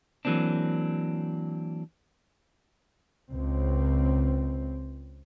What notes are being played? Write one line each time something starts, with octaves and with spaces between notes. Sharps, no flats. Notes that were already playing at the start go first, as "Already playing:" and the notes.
E3 F#3 A#3 C4 D4
C#2 C4